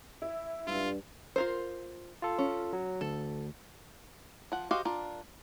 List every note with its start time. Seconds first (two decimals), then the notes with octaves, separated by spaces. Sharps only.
0.22 E4
0.67 G2 F4
1.36 F4 A#4 C5
2.22 F4 A4
2.38 C#4
2.73 F#3
3.01 D2 A4
4.52 F3 F#5
4.71 F#4 G4 C5 D#5 F5
4.85 D4 F4 A#4